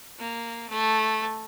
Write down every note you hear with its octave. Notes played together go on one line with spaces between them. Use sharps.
A#3
A3